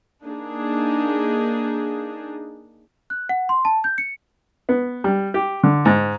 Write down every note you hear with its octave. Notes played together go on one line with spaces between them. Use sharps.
A#3 D4 D#4 G#4
F#6
F#5
C6
A5
G6
C#7
B3
G3
G4
D3
G#2